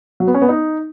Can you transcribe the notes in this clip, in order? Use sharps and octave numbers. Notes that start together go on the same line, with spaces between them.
F#3
B3
C#4
B3
D#4